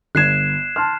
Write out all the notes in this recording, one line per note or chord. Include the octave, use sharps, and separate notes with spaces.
G1 F#6 G#6 C7 E7
A5 C6 F6